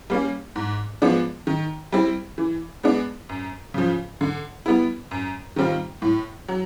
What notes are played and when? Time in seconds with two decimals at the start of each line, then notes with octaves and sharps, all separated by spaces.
0.10 G3 A#3 C#4
0.56 G#2
1.02 F3 G#3 B3 D4
1.47 D#3
1.92 G3 C4 E4
2.38 E3
2.83 G#3 B3 D4
3.29 F#2
3.74 C#3 F3
4.21 D3
4.66 G3 B3 E4
5.11 F#2
5.56 D#3 G3 C4 F4
6.02 A2
6.48 F#3